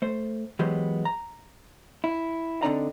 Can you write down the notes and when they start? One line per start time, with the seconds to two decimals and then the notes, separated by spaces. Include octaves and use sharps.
0.02 A3 C5
0.59 E3 F#3 G#3 B3 G4 C5
1.05 A#5
2.04 E4
2.63 D3 C4 D4 D#4 D5 A#5